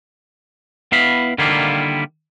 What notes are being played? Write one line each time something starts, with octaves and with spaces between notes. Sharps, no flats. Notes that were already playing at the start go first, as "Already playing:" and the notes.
B3 E4 F5 B5
D3 D#3 G3 A#3 E4 F4